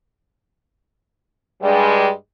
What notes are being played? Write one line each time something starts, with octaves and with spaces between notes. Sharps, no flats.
G2 G3 G#3